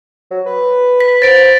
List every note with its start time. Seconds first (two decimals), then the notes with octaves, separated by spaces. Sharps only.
0.31 F#3
0.46 B4
1.00 B6
1.22 C5 A6 D7